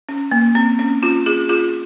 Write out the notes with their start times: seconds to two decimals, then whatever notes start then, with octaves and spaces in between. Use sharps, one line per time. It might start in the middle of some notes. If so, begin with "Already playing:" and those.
0.09 C#4
0.31 A#3
0.55 C4
0.79 C#4
1.02 C#4 F4
1.26 F4 G#4
1.49 F4 G#4